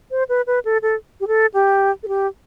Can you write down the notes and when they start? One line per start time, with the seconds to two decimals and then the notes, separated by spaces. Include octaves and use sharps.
0.11 C5
0.29 B4
0.47 B4
0.65 A4
0.82 A4
1.21 G4
1.28 A4
1.54 G4
2.03 A4
2.08 G4